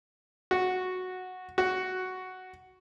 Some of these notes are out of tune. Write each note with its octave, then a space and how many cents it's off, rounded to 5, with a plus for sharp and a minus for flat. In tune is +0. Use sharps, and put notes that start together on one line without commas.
F#4 -5
F#4 +5